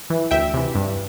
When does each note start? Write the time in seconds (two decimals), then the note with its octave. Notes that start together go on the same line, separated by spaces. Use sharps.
0.10 E3
0.31 D2 E5 G5
0.54 C3 E3
0.75 G2